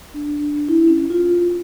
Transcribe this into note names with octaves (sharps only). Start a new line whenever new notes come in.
D4
E4
C#4
F4